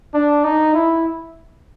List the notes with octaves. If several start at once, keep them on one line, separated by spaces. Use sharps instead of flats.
D4
D#4
E4